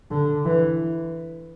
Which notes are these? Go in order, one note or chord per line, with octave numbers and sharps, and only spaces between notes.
D3
E3